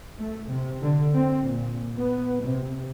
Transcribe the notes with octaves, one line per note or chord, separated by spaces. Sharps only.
A3
C3
D3
C4
A#2
B3
C3